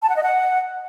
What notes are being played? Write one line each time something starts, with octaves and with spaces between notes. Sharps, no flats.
A5
F#5
D#5
F#5